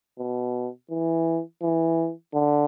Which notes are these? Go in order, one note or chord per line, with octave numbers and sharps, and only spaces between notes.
B2
E3
E3
D3